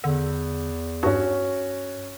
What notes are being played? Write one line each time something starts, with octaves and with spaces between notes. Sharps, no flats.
E2 D3
G2 C#4 F#4